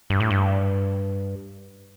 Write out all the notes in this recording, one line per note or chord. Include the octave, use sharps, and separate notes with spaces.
G2
A2
G2